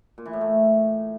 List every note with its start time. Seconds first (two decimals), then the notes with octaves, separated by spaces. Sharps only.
0.18 A#2
0.25 E3
0.33 A2
0.41 A3